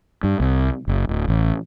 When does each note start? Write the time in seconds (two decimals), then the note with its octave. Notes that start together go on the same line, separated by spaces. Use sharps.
0.24 G2
0.40 C2
0.88 F#1
1.09 D1
1.28 A1